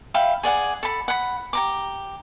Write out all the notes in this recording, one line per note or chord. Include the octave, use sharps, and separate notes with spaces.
E5 F5 G5 B5
G#4 D5 F#5 G#5
A4 B5
F#5 B5
G4 A#5 D6